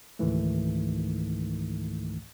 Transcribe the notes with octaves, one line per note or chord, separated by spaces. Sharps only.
C#2 G#2 D#3 E3 A3